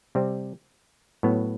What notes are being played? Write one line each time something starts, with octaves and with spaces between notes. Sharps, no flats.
C3 G3 C4
A2 F#3 B3